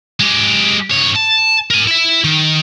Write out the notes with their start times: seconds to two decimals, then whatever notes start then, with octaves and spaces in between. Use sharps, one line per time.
0.20 G#3 G4
0.91 G2 C#5
1.15 A5
1.71 A#4 G#5
1.87 E4 E5
2.24 D#3